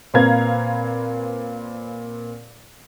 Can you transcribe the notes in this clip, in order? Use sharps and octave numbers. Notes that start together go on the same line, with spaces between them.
A#2 C4 B4 F5 A#5 G#6